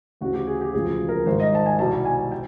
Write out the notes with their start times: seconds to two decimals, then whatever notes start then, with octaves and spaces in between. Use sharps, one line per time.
0.21 D2 C#3 E3 F#4
0.34 G4
0.47 G#4
0.61 G4
0.73 E1 D2 C#3 F3 G#4
1.09 A#4
1.26 G#1 G#2 D#3 G3 C5
1.40 D#5
1.55 A5
1.66 G#5
1.79 C2 B2 G3 A5
2.05 G#5
2.32 G5